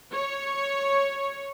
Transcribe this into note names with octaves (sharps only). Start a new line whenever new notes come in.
C#5